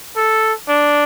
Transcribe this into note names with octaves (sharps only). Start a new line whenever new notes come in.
A4
D4